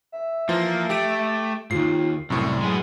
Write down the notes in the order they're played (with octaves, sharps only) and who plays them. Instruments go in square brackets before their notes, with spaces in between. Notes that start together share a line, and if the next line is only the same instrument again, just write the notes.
[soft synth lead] E5
[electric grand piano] E3 F3 F4 [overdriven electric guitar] A#3
[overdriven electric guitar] A3 [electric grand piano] G4 D7
[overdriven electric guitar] D#2 G#2 [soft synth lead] F4 [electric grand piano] C7
[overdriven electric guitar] C2 [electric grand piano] F#2 A2 [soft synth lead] C#6
[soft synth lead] F#3 [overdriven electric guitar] G#3 B3